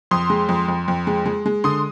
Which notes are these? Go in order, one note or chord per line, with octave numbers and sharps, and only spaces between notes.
F2 C6 D#6
G#3
F2
F2
F2
G#3
G#3
G#3
D3 C6 D#6